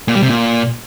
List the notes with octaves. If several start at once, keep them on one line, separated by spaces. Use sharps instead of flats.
A#2
G3
C3
A#2